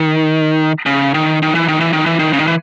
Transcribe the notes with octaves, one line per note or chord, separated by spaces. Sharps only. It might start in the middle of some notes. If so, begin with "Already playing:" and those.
Already playing: D#3
C#3
D#3
D#3
E3
D#3
E3
D#3
E3
D#3
C#3
D#3
E3